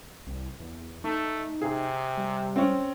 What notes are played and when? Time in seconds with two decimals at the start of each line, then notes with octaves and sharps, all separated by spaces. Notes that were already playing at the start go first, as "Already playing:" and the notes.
0.27 C2
0.60 E2
1.04 A3 D#4
1.62 C3 G#4
2.17 G3
2.56 C4 C#4